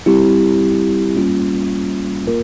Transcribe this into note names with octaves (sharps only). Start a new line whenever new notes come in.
G3 C4 E4 G4
G3 A#3 C#4 F4
A#3 F4 A#4